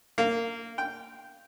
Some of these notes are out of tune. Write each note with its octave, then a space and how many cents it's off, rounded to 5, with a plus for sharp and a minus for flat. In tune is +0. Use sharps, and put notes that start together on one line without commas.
A#3 -20
G5 -10